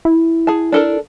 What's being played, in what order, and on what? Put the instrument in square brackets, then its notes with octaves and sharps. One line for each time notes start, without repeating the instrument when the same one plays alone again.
[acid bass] E4
[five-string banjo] G#4 F#5 A5
D4 A4 A#4